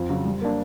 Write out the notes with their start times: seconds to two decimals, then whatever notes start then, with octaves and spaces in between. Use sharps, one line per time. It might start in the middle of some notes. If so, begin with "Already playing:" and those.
Already playing: F2
0.09 C#3 F#3
0.25 G3
0.41 A#3 D4